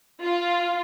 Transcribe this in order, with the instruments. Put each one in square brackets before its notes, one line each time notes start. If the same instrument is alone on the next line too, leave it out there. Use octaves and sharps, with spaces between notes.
[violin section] F4